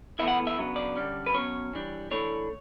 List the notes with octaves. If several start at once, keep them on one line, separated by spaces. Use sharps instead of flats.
A2 E3 B3 E4 E5
F#5
E5
C#3 F#3 B3 D4
D5
D3 G3 C#4
B4
B2 F#3 C#4 C#5
E3 G3 D4
E3 A3 D4 C#5